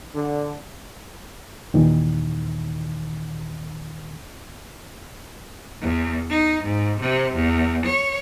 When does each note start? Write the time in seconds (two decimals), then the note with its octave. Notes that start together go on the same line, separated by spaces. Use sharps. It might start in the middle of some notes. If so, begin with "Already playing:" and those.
0.15 D3
1.74 D#2 A#2 D#3 E3
5.82 E2
6.30 D#4
6.64 G#2
7.00 C3
7.35 E2
7.86 C#5